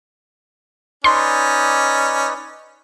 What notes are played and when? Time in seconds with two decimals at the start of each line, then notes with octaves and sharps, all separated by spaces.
1.04 C#4 D#4 B4 D5 C6